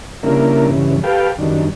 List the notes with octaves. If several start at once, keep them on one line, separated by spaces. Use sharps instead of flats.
C#3 G3 A#3 D4 E4 A#4
G2 C#3 E3
G4 A4 B4 F5 G5
F#2 D#3 G3 D4